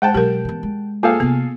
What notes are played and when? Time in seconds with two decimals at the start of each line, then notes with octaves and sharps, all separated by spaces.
0.02 G#3 F#5 G5 A5
0.14 B2 F#3 G4 A#4
0.45 E3 B3
0.63 G#3
1.03 A#3 F4 G#4 A4 F5
1.20 C3 A#3 B3